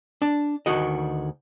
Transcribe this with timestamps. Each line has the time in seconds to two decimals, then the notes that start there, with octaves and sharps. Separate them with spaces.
0.22 D4
0.66 D2 D#3 F#4 D#5